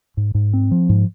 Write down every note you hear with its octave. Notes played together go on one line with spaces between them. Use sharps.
G#2
G#2
C4
F3
G#2